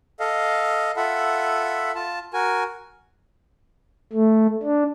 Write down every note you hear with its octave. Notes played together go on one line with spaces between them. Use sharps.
A4 D#5 F5
F4 A4 E5 F#5 B5
F4 A5
F#4 A#4 G#5
A3
D4